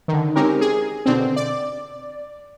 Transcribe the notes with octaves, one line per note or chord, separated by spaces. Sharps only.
D3 D#3
G#3 C4 C#4 D#4 G4 A#4
G#4
B2 D3 C4
D5